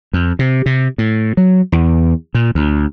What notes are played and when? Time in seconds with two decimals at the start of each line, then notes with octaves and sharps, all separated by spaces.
0.13 F2
0.39 C3
0.66 C3
0.98 A2
1.37 F#3
1.72 E2
2.35 A#2
2.55 D2